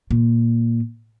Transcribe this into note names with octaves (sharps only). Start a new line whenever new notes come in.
A#2